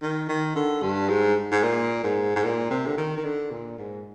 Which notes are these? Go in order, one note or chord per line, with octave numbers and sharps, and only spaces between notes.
D#3
D#3
D3
G2
G#2
G#2
A#2
G#2
G#2
A#2
C3
D3
D#3
D#3
D3
A#2
G#2